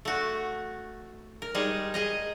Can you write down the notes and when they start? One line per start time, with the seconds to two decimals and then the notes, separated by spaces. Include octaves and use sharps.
0.05 A3 F#4
1.42 A#4
1.55 G3 G#3 D#4 G#4
1.94 G#4 D#5 A#5